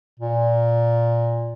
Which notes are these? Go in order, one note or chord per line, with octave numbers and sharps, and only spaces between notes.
A#2